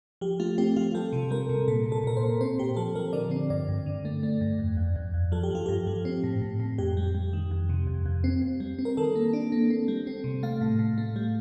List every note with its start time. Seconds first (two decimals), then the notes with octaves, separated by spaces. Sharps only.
0.21 F3 G4
0.40 A3 F4
0.58 C4 G4
0.76 F3 F4
0.95 G3 A4
1.13 C3
1.31 G3 A#4
1.49 C3
1.68 A#2 A4
1.86 A#2
1.92 A4
2.04 A#2 A#4
2.17 C5
2.23 A#2
2.41 C4 C5
2.59 A#2 G4
2.76 F3 A4
2.95 F3 A#4
3.13 D3 D5
3.31 C4
3.50 G2 D5
3.68 G2
3.86 D3
4.05 A3
4.23 A3
4.41 G2
4.59 F2
4.77 F2
4.96 F2
5.14 F2
5.32 F3 A4
5.43 G4
5.51 F3 F4
5.66 G2 G4
5.87 F3
6.05 C4
6.24 A2
6.42 A2
6.60 A2
6.78 F2 G4
6.97 G3
7.15 G3
7.33 D#3
7.51 F2
7.69 C3
7.87 F2
8.06 F2
8.24 C4
8.42 C4
8.60 G3
8.79 C4
8.85 A#4
8.97 D#3 A4
9.15 A#3
9.33 D4
9.52 A#3
9.70 C4
9.88 G3
10.07 C4
10.24 C3
10.43 A3 F5
10.61 A2
10.79 A2
10.98 A3
11.16 G3